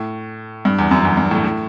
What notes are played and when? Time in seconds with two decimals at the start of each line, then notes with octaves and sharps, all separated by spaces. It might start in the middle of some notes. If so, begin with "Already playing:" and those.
Already playing: A2
0.65 G2
0.79 E2
0.91 F#2
1.05 E2
1.17 G2
1.31 A2
1.44 A2